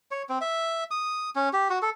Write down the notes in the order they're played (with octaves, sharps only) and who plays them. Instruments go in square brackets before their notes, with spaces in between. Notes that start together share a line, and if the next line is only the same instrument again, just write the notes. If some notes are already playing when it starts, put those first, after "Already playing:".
[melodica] C#5
C4
E5
D#6
C#4
G4
F#4
A4